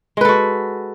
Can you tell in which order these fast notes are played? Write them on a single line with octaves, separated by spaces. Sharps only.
G#3 B4 A4 F#4